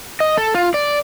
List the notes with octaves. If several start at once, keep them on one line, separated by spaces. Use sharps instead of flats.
D#5
A4
F4
D5